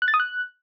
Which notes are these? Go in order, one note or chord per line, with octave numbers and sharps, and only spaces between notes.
F#6
A6
D#6
F#6